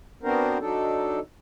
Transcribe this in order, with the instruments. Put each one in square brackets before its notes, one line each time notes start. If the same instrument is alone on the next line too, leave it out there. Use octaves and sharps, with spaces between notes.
[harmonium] B3 C4 D4 F#4 A#4 C5
F#3 D4 D#4 A4